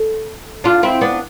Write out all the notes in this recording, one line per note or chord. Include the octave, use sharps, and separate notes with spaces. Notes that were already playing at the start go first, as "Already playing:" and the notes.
Already playing: A4
D4 F4
C4 E4
B3 D4